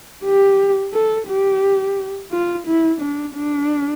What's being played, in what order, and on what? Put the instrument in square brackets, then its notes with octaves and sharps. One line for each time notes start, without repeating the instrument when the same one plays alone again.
[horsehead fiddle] G4
A4
G4
F4
E4
D4
D4